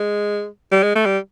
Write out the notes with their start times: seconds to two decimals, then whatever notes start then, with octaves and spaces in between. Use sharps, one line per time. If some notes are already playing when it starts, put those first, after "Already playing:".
Already playing: G#3
0.72 G3
0.83 G#3
0.96 A3
1.06 G3